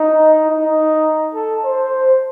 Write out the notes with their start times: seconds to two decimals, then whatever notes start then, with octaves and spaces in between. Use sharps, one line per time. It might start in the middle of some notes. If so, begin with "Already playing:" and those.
Already playing: D#4
0.50 D#4
1.35 A4
1.65 C5